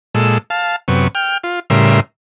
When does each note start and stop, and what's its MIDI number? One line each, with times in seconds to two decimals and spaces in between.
0.15 0.38 46
0.15 0.38 56
0.15 0.38 69
0.15 0.38 88
0.50 0.76 77
0.50 0.76 81
0.88 1.08 42
0.88 1.08 48
0.88 1.08 59
0.88 1.08 85
1.15 1.38 79
1.15 1.38 89
1.44 1.60 65
1.70 2.00 45
1.70 2.00 49
1.70 2.00 55
1.70 2.00 70
1.70 2.00 76
1.70 2.00 84